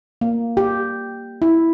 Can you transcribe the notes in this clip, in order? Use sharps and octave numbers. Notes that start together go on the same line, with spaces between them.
A#3
G4
E4